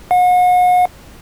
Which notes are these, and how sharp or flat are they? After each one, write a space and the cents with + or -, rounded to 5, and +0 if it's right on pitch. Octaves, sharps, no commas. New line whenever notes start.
F#5 -40